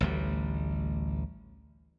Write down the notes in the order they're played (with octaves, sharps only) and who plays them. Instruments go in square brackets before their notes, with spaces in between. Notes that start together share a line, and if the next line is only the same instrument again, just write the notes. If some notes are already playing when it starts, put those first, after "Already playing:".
[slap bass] A1 D2 G3